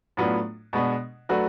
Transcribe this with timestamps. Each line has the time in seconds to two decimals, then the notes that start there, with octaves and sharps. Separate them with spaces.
0.17 A2 F#3 B3 D4 F4
0.73 B2 G#3 B3 D4
1.29 F#3 A3 D4 F#4 B4